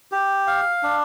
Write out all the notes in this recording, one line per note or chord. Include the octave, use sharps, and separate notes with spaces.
G4
F5
D4